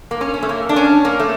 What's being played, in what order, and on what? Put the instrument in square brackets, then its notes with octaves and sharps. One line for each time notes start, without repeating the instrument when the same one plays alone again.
[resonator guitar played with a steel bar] A#3
C#4
C#4
A3
A#3
D4
C#4
A#3
A3